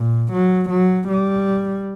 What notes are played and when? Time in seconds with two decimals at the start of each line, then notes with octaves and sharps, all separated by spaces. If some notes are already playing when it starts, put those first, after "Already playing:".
Already playing: A#2
0.33 F#3
0.70 F#3
1.08 G3